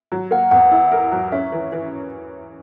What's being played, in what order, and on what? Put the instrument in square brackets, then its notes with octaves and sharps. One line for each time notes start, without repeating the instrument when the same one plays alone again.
[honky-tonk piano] F#3
[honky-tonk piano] A#3 [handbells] F#5
[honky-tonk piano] E2 [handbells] F#5
[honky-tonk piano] E4
A#4
F#3
[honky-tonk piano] C#4 [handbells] E5
[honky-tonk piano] E3
E3